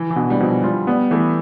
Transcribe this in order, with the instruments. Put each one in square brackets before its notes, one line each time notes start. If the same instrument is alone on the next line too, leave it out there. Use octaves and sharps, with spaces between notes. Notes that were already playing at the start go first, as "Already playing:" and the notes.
Already playing: [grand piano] E3
E3
[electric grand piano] B2 [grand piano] D3
[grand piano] G3
[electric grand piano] B2 [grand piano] F3
[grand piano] G3 [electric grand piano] F4
[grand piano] G3 [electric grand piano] B3
[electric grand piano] E3 [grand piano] A3